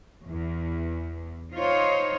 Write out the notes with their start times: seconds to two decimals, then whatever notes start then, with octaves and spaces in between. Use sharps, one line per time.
0.27 E2
1.53 D#4 F4 C5 C#5